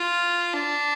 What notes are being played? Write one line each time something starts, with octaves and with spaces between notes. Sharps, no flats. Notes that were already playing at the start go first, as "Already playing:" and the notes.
Already playing: F4
D4